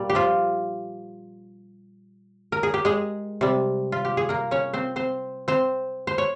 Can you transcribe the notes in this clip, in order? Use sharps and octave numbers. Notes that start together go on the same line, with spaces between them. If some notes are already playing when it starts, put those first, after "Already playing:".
Already playing: A#2 G3
G4
F3 F4
A#4
G#4
G4
G#3 G#4
C3 G3
F4
G4
G#4
A#3 A#4
C#4 C#5
C4 C5
C4 C5
C4 C5
C5
C#5